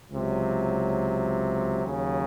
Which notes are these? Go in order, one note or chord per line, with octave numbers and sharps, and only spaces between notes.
C#2 C3 F#3
D#2 C#3 F#3